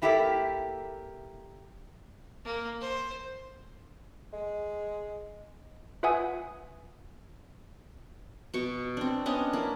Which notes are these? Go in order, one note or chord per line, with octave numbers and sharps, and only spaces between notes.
A#3 E4 G4 A4 A#4 E5
A#3
C5
G#3
F4 B4 E5 F#5 G#5 D#6
B2 C#6
C4 D4
B3 C#4 D4 D#5
A#3 E4